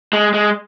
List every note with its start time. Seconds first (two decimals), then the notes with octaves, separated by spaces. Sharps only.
0.13 G#3
0.34 G#3